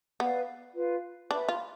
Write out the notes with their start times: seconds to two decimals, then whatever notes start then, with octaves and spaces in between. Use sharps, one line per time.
0.20 B3 B4 D5 F5
0.75 F4 B4 F5
1.30 D4 B4 E5 B5
1.49 F4